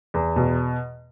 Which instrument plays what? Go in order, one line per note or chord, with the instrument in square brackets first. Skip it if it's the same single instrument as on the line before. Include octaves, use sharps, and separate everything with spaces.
[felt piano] E2
B2